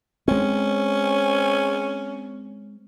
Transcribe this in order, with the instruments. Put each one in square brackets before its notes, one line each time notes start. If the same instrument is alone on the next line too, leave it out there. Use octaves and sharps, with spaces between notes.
[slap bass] G#3 C4 [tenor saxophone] C#4